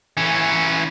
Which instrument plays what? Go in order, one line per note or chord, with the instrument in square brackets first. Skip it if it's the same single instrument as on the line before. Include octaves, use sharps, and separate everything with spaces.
[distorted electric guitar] E3 C#4